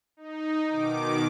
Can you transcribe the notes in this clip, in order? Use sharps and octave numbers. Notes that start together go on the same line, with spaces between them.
D#4
B2 D#3 D6